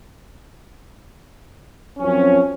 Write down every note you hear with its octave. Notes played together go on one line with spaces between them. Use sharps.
F#2 F3 C4 C#4